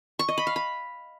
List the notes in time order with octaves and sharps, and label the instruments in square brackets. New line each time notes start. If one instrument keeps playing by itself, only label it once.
[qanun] C#6
D#5
B5
F5
B5